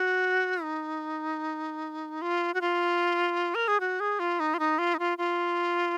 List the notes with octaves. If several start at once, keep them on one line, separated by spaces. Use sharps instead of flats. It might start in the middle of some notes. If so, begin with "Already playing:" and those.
Already playing: F#4
D#4
F4
F#4
F4
A#4
G#4
F#4
G#4
F4
D#4
F4
D#4
F4
D#4
F4
F4